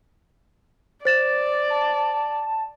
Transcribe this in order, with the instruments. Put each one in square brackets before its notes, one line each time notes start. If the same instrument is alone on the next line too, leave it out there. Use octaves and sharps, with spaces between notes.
[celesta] C5 A6 E7 [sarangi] D5
[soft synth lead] A5